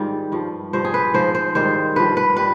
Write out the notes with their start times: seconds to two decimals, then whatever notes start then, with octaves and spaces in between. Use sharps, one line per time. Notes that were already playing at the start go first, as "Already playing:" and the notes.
Already playing: G#2 D#3 G3 F4
0.32 G2 F3
0.73 G2 F3 C5
0.85 G#4
0.94 B4
1.14 G#2 F3 C5
1.35 C5
1.55 G#2 D#3 G3 C5
1.96 G2 F3 B4
2.17 B4
2.37 G3 B4